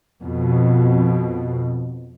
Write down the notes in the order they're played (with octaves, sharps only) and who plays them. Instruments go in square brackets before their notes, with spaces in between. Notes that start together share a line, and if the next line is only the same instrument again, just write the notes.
[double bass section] F2 B2